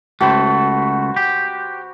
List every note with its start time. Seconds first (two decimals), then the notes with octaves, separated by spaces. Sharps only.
0.21 C#2 A3 F#4 C5 B5
1.17 G4